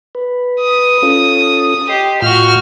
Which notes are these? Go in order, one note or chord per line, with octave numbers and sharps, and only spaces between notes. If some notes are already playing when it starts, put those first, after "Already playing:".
B4
D#6
C#4 F4 A4
G4 D#5 C6
A2 F4 F#4 F6 G6